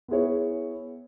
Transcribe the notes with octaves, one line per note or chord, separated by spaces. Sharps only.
B3 E4 G#4 C#5